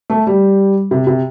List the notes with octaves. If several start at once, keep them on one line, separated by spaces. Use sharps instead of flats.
A3
G3
C3
C3